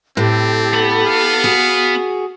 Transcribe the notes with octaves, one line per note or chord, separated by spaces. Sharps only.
A2 C4 G4 A4
B3 B5
F5
F#4 G#4